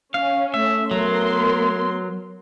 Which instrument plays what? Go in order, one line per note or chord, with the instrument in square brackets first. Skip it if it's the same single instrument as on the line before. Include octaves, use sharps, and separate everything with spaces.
[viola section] C#4 [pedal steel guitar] F5
[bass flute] A3 [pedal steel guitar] E5
[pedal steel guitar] F#3 [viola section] B3 A#4 C6